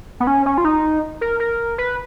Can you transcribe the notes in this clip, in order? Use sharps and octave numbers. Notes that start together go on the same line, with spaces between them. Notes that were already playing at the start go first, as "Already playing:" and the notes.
B3
C#4
C#4
F4
D#4
A#4
A#4
B4